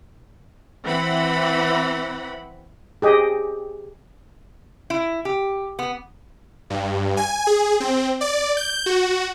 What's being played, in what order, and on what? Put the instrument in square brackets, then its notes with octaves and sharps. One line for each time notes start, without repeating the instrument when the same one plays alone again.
[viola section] E3 C4 F#5 B5
[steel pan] G4 G#4 D#5
[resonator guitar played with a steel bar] E4
G4
B3
[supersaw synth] G2
G#5
G#4
C4
D5
G6
F#4